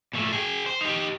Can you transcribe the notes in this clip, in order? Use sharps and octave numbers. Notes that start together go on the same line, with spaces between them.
A#2 A3
G#4 G5
C5
D#4 G4